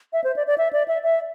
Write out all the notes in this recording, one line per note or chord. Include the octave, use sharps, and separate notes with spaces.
E5
C5
D5
D5
E5
D5
E5
E5